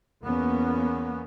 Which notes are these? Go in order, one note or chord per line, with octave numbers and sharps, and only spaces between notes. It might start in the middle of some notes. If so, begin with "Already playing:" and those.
E2 A#3 B3 C#4